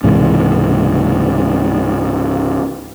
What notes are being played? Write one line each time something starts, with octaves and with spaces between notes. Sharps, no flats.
C#2 G#2 C3 E3